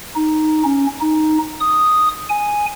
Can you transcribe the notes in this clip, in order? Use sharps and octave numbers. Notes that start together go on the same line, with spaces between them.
D#4
C#4
D#4
D#6
G#5